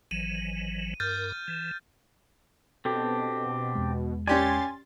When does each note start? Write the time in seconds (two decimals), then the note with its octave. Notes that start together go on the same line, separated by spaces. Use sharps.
0.11 G#1 E3 F#3 D#7
1.00 G2 A#4 F6 G6 A6
1.48 E3
2.85 B2 C4 D4 G4 A4 A5
3.75 E2 G#3
4.27 C#4 G4 D5 G#5 C6 A6